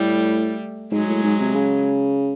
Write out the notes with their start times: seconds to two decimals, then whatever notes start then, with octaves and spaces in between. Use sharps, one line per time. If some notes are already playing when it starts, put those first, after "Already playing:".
Already playing: A2 G3 A3
0.92 G#2 F#3 G#3
1.09 A2
1.23 G#2
1.40 C3
1.55 C#3